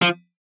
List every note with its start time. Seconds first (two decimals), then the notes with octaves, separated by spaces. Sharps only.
0.02 F3